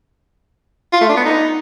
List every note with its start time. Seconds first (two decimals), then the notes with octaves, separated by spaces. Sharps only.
0.93 F4
1.01 A3
1.09 D4
1.17 B3
1.25 D#4